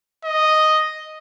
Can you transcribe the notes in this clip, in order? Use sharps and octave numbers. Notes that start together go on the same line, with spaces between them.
D#5